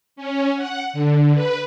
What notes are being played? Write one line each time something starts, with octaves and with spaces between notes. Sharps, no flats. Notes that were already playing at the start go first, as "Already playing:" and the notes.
C#4
F#5
D3
B4